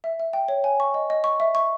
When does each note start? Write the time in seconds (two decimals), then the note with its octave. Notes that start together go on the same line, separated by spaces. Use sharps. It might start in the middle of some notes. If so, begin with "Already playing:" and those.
0.04 E5
0.20 E5
0.33 G5
0.48 C#5
0.64 G#5
0.80 C#6
0.94 D#5
1.10 D#5
1.24 C#6
1.40 E5
1.55 C#6